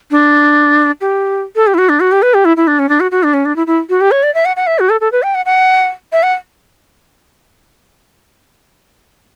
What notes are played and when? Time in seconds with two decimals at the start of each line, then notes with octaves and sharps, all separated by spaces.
0.11 D4
1.01 G4
1.56 A4
1.67 G4
1.74 E4
1.78 F#4
1.89 D4
2.00 F#4
2.12 G4
2.22 B4
2.34 G4
2.45 E4
2.57 E4
2.67 D4
2.79 C#4
2.89 D4
3.00 F#4
3.11 F#4
3.23 D4
3.34 C#4
3.45 D4
3.56 E4
3.67 E4
3.90 F#4
4.01 G4
4.11 C#5
4.23 D5
4.35 E5
4.45 F#5
4.56 F#5
4.67 E5
4.79 F#4
4.90 A4
5.01 A4
5.12 B4
5.23 G5
5.35 F#5
5.46 F#5
6.13 E5
6.23 F#5